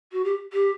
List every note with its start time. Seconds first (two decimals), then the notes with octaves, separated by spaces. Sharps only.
0.12 F#4
0.24 G4
0.53 G4